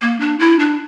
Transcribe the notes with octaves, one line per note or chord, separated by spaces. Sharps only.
A#3
D4
E4
D4